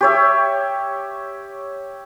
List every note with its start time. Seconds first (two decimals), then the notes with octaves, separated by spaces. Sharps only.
0.01 G4 C#5 E5